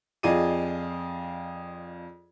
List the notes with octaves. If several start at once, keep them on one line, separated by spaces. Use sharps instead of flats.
F2 F4 G#4 D5 D#5 D#7